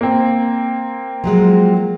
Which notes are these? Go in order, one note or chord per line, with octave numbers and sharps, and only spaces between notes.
A#3 C4
F3 F#3 G#3